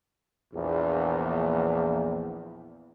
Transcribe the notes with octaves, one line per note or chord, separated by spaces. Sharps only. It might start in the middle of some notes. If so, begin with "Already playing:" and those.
A#1 E2